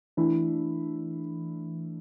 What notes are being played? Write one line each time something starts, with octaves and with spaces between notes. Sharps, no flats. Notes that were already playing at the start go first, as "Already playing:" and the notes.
E3 A3 D4 E4